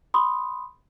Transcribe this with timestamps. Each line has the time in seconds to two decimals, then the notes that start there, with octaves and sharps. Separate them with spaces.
0.14 B5 C6 D#6